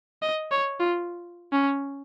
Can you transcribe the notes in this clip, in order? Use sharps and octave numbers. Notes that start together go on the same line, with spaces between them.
D#5
C#5
F4
C#4